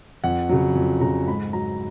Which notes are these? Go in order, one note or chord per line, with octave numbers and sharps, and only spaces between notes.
F2 F#5
C#3 F#3
F2
C#3 F#3 A#5
G#2 B5
F#3 A#5